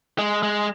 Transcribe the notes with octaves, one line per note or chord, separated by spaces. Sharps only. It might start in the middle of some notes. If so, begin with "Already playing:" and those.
G#3
G#3